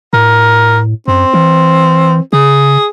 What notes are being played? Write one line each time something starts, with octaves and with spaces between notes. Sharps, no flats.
A2 A#4
F#2 C4
E3
C#3 G#4